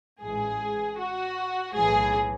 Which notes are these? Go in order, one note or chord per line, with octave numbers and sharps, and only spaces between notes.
A1 G#2 E3 G#4
F#4
B1 A2 E3 G#4